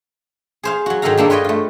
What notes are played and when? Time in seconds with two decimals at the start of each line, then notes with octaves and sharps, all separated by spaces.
0.63 G#4 C5 F5
0.86 F#3 F#4
1.02 G#2 D#3 G#4 A4 F5 A#5
1.17 G2 A#3 D4 A4
1.30 F4 B4 C#5 D#5 G5
1.44 A3 F4